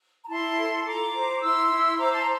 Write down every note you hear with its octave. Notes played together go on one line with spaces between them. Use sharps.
A#5
E4 A5 C6
A4
F4 A#5 D6
C5
E4 C6 E6
E4
C5 A#5 D6
A5 C6
A#5